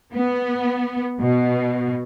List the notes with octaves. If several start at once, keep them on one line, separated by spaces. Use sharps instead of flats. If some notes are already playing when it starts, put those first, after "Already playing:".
B3
B2